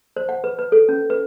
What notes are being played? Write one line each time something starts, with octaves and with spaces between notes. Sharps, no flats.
C5
F#5
B4
B4
A4
C#4
B4